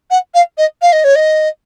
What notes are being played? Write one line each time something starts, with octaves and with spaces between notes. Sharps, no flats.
F#5
F5
D#5
F5
D#5
C#5
D#5